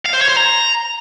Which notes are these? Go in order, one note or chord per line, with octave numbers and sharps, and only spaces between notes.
F5
C5
C#5
C5
A#5